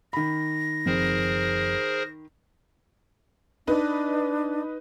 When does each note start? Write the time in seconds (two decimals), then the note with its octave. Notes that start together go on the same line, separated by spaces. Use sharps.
0.13 D#3 B5 A#6
0.86 F#1 F3 C4 G#4 A#4 C5
3.67 D4 D#4 B4